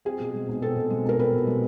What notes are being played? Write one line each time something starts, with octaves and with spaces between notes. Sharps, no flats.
C4 G#4
B2
G#3
B1
C4 A4
B2
G#3
B1 A#4
C4 B4
B2
G#3